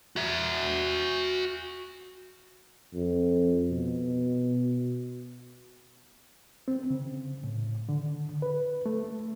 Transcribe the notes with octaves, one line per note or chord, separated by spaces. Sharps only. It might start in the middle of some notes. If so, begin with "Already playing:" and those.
F#4 E5
F2
B2
C4
C#3
A2
D3
B4
A3